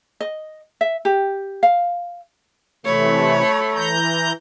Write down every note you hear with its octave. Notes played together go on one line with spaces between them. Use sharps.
D#5
E5
G4
F5
C3 E3 A3 C#5 B5
E3 A#5 G6